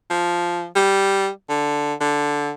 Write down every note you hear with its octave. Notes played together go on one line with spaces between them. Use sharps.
F3
G3
D3
D3